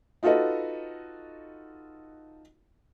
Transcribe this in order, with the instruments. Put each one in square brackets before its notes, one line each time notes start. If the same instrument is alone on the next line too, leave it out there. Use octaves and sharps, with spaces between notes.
[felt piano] D#4 F4 F#4 A4 B4 D#5